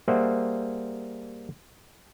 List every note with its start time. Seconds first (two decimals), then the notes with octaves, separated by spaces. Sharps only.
0.08 G3 A#3 G#4 C5 E5 F#5